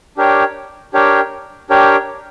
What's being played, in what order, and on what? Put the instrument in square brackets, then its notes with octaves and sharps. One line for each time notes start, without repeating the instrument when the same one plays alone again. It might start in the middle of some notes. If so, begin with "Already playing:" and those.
[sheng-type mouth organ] D4 G4 A#4 C#5 G5
D4 G4 A#4 C#5 G5
D4 G4 A#4 C#5 G5